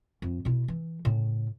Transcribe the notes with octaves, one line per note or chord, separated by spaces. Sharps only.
F2
B2 E4
E3
A2 C#3